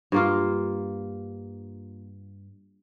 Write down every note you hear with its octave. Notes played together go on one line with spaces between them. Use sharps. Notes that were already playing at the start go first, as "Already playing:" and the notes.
G2 A#3 F4